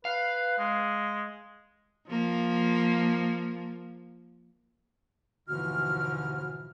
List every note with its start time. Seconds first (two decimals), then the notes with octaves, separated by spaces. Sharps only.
0.05 B4 F5
0.58 G#3
2.09 F3 A#3
5.48 D#2 G#2 B2 D3 E3 F3 F#4 F6